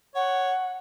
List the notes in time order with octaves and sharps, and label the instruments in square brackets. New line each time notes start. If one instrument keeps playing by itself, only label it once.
[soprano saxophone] C#5 [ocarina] F#5